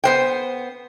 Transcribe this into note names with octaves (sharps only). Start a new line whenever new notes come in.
B3 C5 G5